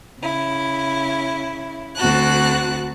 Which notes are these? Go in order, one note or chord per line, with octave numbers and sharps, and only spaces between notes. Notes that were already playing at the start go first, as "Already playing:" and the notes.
C#3 E4
D2 C4 F#4 A5 F#6